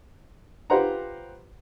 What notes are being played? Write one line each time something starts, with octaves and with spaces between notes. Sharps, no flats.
F4 G4 B4 C5 F#5 A#5